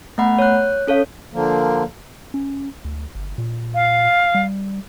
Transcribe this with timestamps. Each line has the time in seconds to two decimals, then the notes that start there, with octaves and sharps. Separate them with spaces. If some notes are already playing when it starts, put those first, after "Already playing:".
0.18 A3 B3 F#5 B5
0.39 C#5 F#6
0.87 C#4 A4 C#5 F5
1.33 D3 F3 A#3
2.34 C#4
2.85 D2
3.15 G1
3.38 A#2
3.75 F5
4.35 G3